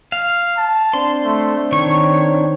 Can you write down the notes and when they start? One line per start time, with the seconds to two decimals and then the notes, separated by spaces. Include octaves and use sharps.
0.12 F5
0.57 A5
0.93 C4 D4 C6
1.24 A3
1.72 D#3 C#5 C#6